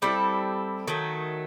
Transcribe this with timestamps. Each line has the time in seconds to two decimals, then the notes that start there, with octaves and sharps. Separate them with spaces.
0.02 G3 C4 E4 A4
0.87 D#3 F#3 A3